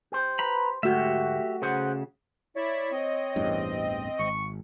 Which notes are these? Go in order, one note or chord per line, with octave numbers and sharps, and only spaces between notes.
G4 C5
B4 A#5 B5
D2 G#2 A3 F#4 G4 E5
C#3 G#4 C5 F#5
E4 C#5 D5 E5
C4 D#5
A1 E2 G2
G#1 C#6